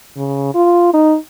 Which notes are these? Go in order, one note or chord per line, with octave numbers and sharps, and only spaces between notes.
C#3
F4
D#4